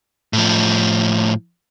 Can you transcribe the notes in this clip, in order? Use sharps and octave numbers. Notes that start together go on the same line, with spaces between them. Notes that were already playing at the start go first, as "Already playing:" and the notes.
A2 F3